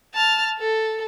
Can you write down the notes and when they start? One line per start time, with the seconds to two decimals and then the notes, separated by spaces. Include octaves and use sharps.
0.14 A5 F6
0.59 A4